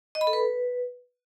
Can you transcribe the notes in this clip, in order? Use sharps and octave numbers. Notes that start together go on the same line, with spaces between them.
D#5
B5
A4
B4